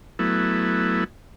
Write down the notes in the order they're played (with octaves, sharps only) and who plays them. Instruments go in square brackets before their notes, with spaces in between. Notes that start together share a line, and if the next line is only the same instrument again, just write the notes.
[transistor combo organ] F#3 A3 B3 E4